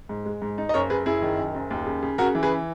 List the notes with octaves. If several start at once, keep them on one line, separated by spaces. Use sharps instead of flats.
G#2
G#3
G#2
D#4
D#5
F#1 A#4 C#5
F#1 G#4 B4
F#1 E4 G#4
D#3
F#2
F#1
D#2
C#3
C#3
C#3 F#4 A#4
E3
G#4 B4